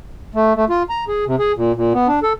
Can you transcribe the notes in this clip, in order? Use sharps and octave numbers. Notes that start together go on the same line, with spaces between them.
A3
A3
F4
A#5
G#4
C3
G#4
A#2
A#2
B3
D4
A4